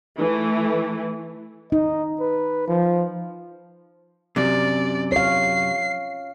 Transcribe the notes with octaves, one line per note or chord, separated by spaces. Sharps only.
E3 A3
D#4 D#5
B4
F3
F#2 C3 D5
C#5 F5 C7